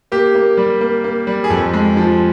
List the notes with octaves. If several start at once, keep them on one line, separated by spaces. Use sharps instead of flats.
A#3 G4
A#3
G3
A#3
A#3
G3
G#4
F2 A4
G#3
F3